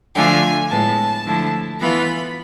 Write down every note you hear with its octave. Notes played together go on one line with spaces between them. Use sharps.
D3 F3 A3 D4 F4 G#5
A2 G#3 B3 A5
D3 F3 A3 E4
E3 B3 F4 B5